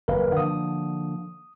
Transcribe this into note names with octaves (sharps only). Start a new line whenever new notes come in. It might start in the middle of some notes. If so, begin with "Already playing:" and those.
F#1 D#2 A#4 B4 F5
D3 F3 A#3 D#6